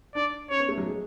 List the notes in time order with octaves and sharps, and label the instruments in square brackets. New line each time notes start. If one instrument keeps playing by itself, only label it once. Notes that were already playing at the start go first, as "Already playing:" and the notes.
[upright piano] D4 [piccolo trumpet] D5
[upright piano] C#4 [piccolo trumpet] C#5
[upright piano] B3
A3
F#3
G#3